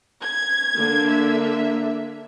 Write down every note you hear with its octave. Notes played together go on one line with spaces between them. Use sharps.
G#6
D3 A#3 D4
E5